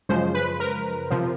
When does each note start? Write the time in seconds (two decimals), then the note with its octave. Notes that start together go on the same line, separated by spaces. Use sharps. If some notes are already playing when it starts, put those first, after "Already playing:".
0.09 F#2 C#3 F3 G#3 C5
0.35 B4
0.60 A#4
1.10 C3 F3